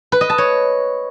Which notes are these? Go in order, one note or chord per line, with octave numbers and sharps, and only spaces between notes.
B4
D#5
A5
C#5